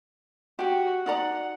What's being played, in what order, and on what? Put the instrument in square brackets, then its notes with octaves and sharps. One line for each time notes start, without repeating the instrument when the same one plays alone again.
[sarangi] F#4 [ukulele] G4 G5
[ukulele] D#4 D5 A#5 [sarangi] F#5